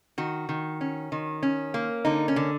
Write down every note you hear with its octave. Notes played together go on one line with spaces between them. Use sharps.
D#3 F#4
D#3
C#4
D#3
C#4
A#3
D3 D#4
C#4
D3